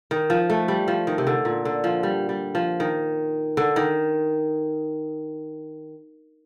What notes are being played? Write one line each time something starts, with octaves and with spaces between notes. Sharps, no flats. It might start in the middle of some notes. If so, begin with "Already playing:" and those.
D#3
F3
A3
G3
F3
D#3
C3
D3
A#2
D3
F3
G3
G3
F3
D#3
D3
D#3